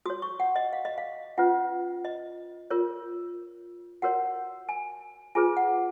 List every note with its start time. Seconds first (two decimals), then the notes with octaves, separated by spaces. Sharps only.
0.06 F#4 C#5 D#6
0.22 C#6
0.40 F#5
0.56 D#5
0.73 F5
0.85 D#5
0.98 F5
1.38 C#4 F4 B4 F#5
2.05 D#5
2.70 F4 A#4 C#5
4.02 F#4 A#4 C#5 F#5
4.69 G#5
5.35 F4 G#4 B4 G#5
5.57 F#5